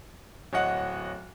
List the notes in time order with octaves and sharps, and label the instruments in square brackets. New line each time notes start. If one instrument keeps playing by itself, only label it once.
[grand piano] D1 C#5 D#5 F#5